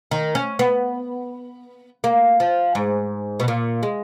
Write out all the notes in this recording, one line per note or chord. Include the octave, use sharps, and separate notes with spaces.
D#3
C#4
B3
A#3
F3
G#2
B2
A#2
G#3